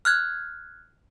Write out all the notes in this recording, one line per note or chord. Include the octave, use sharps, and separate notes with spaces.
F6 F#6 G#6